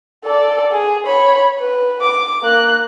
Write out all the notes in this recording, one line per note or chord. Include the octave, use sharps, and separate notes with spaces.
A4 D5
G#4
C#5 B5
B4
D6
A#3 F#6